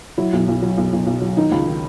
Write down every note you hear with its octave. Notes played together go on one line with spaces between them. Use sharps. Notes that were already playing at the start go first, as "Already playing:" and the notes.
F#3 E4
B1
B1
F#3
B1
B1
B1
F#3
D#3 D#4
C#2
D#3